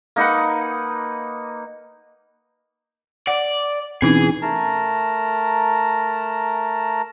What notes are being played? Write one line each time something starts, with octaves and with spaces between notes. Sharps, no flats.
A#3 D#4 B4 F#5
D5 F#5
B2 E3 C4 C#4 D#4 G#4
A3 A#4 A5 A#5